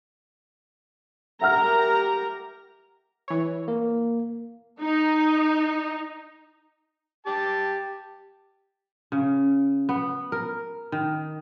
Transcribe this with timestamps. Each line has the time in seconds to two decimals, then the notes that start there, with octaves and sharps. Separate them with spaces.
1.41 G4 A#4 E5 F#5 A#5 F6
3.28 E3 C#5
3.68 A#3 A#4
4.82 D#4
7.26 G4 A5 D6
9.12 C#3
9.89 B3
10.32 A#4
10.92 D#3